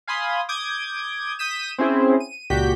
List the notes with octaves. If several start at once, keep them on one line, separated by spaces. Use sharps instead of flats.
F5 G#5 B5 C6 D#6
D6 D#6 G6 G#6
D#6 G6 B6 D#7 E7
C4 C#4 E4 G#4 C5
D#7
C#2 A#2 F#4 G4 G6 B6